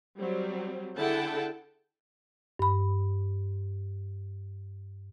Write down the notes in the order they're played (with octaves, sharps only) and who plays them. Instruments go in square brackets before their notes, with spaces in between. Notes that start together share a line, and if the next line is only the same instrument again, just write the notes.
[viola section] F#3 G3 C4
D3 E4 G#4 F#5 G5 A5
[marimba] G2 B5